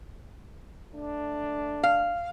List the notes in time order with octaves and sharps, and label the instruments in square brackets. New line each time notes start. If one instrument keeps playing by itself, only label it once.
[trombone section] A3 D4
[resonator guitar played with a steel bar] F5